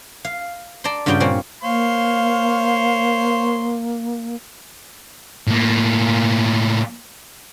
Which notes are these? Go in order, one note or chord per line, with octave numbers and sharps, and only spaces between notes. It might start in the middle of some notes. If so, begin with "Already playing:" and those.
F5
D5 A5 A#5 C6
G2 C#3 G3 F4 F#4 G5
A#2 C4 C#4 F5
A#3 C5 C#5 F5 C6
A2 A#3